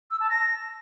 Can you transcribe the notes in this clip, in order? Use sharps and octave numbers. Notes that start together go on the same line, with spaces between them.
E6
A5
A#6